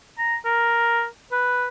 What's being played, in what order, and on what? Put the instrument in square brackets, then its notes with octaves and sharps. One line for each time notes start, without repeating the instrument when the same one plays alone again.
[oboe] A#5
A#4
B4